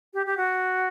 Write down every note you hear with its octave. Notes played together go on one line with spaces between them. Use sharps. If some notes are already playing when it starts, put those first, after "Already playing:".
G4
G4
F#4